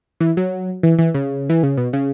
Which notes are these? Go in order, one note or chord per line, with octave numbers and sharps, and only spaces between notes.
E3
F#3
E3
E3
C#3
E3
C#3
B2
C#3